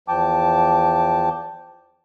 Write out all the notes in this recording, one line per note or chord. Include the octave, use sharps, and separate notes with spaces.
E2 F3 G5 A5 D6